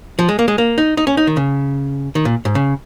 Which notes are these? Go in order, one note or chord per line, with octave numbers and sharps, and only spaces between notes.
F3
G#3
A#3
G#3
A#3
D#4
D#4
C#4
D#4
D#3
C#3
D#3
A#2
G#2
C#3